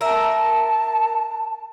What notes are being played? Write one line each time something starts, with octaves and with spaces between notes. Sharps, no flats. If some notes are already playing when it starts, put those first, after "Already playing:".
A#4 E5 A5